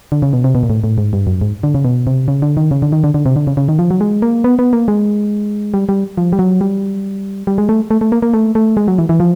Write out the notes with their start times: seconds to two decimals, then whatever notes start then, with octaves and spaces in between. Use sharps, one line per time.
0.12 D3
0.22 C#3
0.33 B2
0.44 C3
0.55 B2
0.63 A#2
0.70 A2
0.84 A2
0.98 G#2
1.13 G2
1.27 F#2
1.41 G#2
1.63 D3
1.75 C#3
1.85 B2
2.07 C3
2.28 C#3
2.42 D3
2.57 D#3
2.71 C#3
2.82 D3
2.92 D#3
3.04 D3
3.14 D3
3.26 C3
3.36 D3
3.47 C#3
3.57 C#3
3.69 D#3
3.79 F3
3.91 F#3
4.01 G#3
4.22 A#3
4.44 B3
4.59 B3
4.73 A#3
4.88 G#3
5.74 G3
5.89 G3
6.18 F3
6.33 G3
6.39 F#3
6.61 G3
7.47 G3
7.58 G#3
7.69 A3
7.91 A3
8.01 A3
8.12 A#3
8.22 A#3
8.34 A3
8.55 A3
8.77 G#3
8.88 F#3
8.99 E3
9.09 E3
9.20 F3